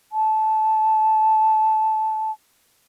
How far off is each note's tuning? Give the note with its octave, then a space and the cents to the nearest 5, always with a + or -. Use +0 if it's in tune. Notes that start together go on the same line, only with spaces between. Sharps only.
A5 -15